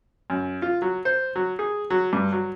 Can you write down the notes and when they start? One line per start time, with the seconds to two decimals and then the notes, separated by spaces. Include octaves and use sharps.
0.30 F#2
0.62 F4
0.82 F#3
1.05 C5
1.36 F#3
1.59 G#4
1.90 F#3
2.13 G2
2.32 F#3